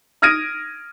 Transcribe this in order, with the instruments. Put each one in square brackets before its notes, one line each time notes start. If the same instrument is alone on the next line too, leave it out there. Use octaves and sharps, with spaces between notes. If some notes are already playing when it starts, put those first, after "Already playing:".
[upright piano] D#6 F6 G#6 A#6 D7 D#7